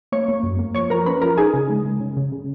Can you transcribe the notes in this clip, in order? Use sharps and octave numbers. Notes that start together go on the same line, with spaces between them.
A#3 C#5 C#6
A#3
F#2
A#3
F3 C#5 C#6
F3 A#4 A#5
C#4 B4 B5
F3 A#4 A#5
D#4 G#4 G#5
C#3
G#3
G#3
C#3
C#3
C#3